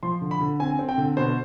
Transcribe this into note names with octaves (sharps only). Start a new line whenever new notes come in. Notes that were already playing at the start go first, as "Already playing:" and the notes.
F3 C6
D3
B5
D3
C4 G#5
C4
G5
D3
B2 C5